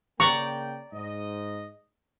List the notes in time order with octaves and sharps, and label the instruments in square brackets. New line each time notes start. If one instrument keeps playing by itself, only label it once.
[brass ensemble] C#3 A#3 G5 [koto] D5 A#5 [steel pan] C#6
[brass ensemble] G#2 D#5